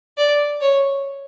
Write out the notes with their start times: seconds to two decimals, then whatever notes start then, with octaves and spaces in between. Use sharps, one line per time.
0.17 D5
0.61 C#5